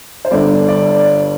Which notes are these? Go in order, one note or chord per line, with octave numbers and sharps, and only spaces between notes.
C5
G1 G2 D3 D5
D5